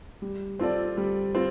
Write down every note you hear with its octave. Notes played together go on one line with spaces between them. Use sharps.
G3
C4 F4 A4 D5
G3
C4 F4